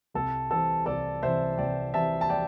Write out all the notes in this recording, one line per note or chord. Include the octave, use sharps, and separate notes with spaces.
C2 A4
C3 E3 C4 A4
C2 A4 D5
C3 E3 C4 C5 E5
C2 D5 G5
C3 E3 C4 E5 A5
A5
D5 G5